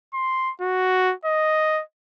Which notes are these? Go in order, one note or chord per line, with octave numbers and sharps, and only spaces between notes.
C6
F#4
D#5